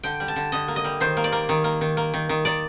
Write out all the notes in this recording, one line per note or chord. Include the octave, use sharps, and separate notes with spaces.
D3 G5
G3
A5
D3
D3 D#5
A#3
D#5
G3
D#3 C5
A#3
D5
A#3
D#3
A#3
D#3
A#3
D#3
D#3
D#3 D5